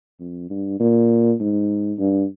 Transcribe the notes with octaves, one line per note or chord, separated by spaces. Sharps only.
F2
G2
A#2
G#2
G2